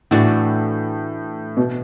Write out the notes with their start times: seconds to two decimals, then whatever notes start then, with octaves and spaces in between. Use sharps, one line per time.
0.11 A2 E3 A3 D4 F#4
1.57 B2